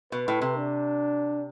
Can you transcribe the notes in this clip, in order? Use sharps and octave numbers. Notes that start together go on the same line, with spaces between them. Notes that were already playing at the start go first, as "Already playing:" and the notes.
B2 B4
A2
C3
D4